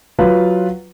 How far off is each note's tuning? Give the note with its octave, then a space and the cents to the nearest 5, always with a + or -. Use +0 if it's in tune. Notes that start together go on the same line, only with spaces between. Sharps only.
F#3 +0 F4 +0 B4 +0